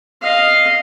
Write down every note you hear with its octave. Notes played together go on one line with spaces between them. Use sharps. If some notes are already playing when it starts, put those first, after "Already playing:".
D#5 F5